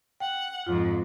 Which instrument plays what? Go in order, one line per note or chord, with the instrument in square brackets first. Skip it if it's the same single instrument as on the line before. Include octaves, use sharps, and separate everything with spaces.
[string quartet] F#5 [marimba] G5
[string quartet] F2 G#2 [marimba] F4